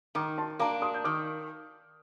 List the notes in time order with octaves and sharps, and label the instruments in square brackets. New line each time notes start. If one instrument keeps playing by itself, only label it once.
[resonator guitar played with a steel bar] D#3 [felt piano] A#5 D6
[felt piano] A5 C6
[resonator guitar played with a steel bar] A#3 D4 [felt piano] A#5 D6
[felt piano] C6 D#6
G6
[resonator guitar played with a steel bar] D#3 [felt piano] D6 F6